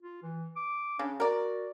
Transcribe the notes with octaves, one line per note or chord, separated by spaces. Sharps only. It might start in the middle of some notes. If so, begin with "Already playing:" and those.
F4
E3
D6
C#3 D4
F#4 A#4 D5